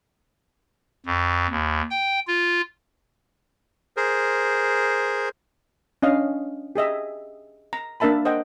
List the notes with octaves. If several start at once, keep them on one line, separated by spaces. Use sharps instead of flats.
F2
D#2
G5
F4
G#4 A#4 C5
C#4 D4 D#5 F5
G4 G#4 D#5 E5
A#5
A#3 D4 A#4 E5 A5 B5
C5 D#5 F#5 G5